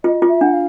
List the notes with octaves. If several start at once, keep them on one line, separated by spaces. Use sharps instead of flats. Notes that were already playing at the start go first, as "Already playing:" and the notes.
F4 D#5
F4
E5
D4 F#5
F5